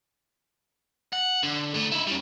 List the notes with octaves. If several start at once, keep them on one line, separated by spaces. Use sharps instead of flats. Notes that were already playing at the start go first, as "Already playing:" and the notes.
F#5
D3
D3 A3
D#4 E4
G3 C#4